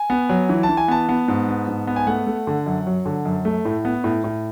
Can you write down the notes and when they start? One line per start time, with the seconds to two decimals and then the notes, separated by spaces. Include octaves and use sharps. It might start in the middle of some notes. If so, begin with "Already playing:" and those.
Already playing: G#5
0.10 B3
0.29 F#3
0.49 E3
0.63 A5
0.69 E3
0.77 G#5
0.88 B3 A5
1.09 B3
1.28 G#2
1.48 B3
1.68 G#2
1.87 B3
1.96 G#5
2.07 A3 F#5
2.27 A3
2.47 D3
2.66 F#2
2.87 F#3
3.06 D3
3.25 F#2
3.45 A3
3.65 A2
3.85 B3
4.04 A2
4.24 A2